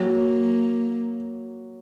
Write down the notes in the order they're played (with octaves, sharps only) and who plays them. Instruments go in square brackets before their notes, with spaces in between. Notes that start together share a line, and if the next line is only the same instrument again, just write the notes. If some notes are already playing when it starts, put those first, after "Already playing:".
Already playing: [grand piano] F#3 [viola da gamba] A#3